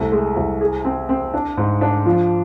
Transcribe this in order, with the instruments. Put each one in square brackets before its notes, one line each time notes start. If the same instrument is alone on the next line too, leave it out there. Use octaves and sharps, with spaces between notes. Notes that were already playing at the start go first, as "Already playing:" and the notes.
Already playing: [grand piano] C2 A3
G#3
C2
G#4
C4
C4
D4
G#2
D4
F3